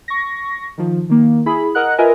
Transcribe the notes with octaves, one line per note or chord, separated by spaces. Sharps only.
C#6 A#6
D#3 F3
D#3 A#3
E4 G#4 B5
A#4 D#5 F#5 F#6
F4 A#4 B4 D#5 E5 G#5